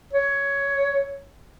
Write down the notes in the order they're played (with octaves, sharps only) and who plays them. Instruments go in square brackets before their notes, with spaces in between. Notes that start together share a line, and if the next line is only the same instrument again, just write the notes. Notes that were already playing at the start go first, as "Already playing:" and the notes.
[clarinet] C#5